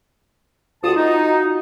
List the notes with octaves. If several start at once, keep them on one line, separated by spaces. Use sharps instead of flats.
D2 F4 F#4 A5 D#6
D#4